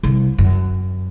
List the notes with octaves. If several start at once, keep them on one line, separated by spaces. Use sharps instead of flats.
C2
F#2